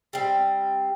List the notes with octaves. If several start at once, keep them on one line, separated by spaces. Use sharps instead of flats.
G3 C4